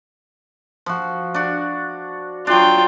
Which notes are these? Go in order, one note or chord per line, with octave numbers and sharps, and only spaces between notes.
F3 F#4
D4 F#4
F#3 D4 F4 G5